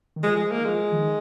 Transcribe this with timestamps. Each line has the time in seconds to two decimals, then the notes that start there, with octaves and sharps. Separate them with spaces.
0.16 D#3
0.23 F3 G#3
0.37 G#3
0.51 A#3
0.58 D#3
0.65 F3 G#3
0.78 F3
0.92 D#3